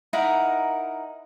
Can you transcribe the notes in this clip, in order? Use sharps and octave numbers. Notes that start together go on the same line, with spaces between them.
D#4 E4 A#4 F#5